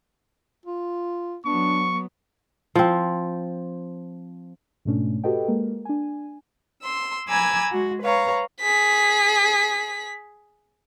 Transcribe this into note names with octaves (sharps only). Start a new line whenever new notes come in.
F4
F#3 B3 D4 C#6
F3 C4
G#2 B2 A3 C#4 D4
F#4 G4 A4 B4 D#5 G5
G#3 A#3 A#4
D4 G#5
C6 E6
G#5 A#5 B5 D6 E6 G#6
G#3 F#4
B4 C#5 F5 A#5
G#4 B6